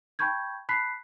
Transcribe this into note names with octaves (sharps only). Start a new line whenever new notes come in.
G5 A5 B5 C#6 G6 G#6
A5 B5 F#6 B6 C7